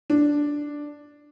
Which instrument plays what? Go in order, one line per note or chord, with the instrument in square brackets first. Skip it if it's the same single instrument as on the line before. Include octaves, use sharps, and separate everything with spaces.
[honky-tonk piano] D4